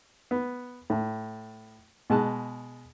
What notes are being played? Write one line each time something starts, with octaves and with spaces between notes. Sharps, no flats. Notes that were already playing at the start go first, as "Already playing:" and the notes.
B3
A2
B2 G#3 A5 F#6